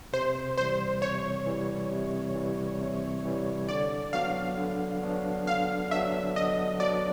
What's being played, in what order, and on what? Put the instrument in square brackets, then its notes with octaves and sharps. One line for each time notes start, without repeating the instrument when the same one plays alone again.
[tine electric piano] C3 [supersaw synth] C5
[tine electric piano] E3 G3 [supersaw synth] C5
[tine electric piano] C3 [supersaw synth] C#5
[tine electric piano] E3 G3
C3
E3 G3
C3
E3 G3
[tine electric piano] D3 [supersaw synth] D5
[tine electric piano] F#3 B3 D4 F#4 [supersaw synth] F5
[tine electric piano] D3
F#3 B3 D4 F#4
[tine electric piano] D3 [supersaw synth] F5
[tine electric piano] F#3 B3 D4 F#4 [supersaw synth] E5
[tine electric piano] D3 [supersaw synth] D#5
[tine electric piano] F#3 B3 D4 F#4 [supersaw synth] D5